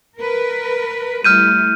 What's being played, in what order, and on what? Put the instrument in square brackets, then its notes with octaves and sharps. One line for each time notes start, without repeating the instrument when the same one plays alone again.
[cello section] A#4 B4
[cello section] G3 A3 E4 [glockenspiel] F6 G6 D#7